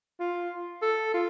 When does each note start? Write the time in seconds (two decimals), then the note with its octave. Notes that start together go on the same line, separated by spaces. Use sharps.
0.20 F4
0.82 A4
1.14 F4